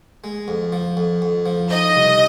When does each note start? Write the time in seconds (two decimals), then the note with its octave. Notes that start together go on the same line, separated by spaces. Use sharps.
0.24 G#3
0.48 F2
0.72 F3
0.97 F2
1.22 F2
1.46 F3
1.71 D#4 D#5
1.95 C2